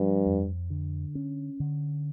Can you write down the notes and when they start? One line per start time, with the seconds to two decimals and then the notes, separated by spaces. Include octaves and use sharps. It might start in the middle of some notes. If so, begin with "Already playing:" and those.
Already playing: G2 F3
0.26 F2
0.70 D3
1.15 C#4
1.60 D3